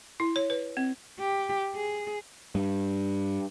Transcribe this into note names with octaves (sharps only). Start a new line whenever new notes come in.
E4
C#5
B4
C4
G4
G#4
G2